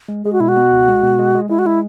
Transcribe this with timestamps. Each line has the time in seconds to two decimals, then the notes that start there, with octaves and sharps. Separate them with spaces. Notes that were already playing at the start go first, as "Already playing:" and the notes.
0.08 G#3
0.25 G#3 G#4
0.33 F#4
0.40 B2 E4
0.48 F#4
0.57 B2
0.72 C#2
0.88 G#3
1.02 B2
1.19 G#3
1.35 G#3
1.49 G#3 E4
1.59 F#4
1.65 G#3 E4